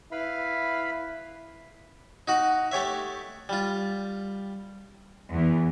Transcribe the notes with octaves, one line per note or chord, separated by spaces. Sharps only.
E4 B4 F5 B5
D#4 F#4 F#5
A3 G4 C#5 E5
G3 F4
E2